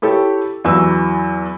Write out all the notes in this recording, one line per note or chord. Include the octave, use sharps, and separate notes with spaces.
E4 G4 A4 C#5
E2 E3 F#3 E6